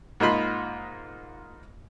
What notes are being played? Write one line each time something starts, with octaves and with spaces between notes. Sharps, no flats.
G#2 A#3 D#4 F4 B5 C6